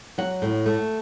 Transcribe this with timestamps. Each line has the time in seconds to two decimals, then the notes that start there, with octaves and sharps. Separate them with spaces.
0.18 F#3 F#5
0.42 A2
0.66 A3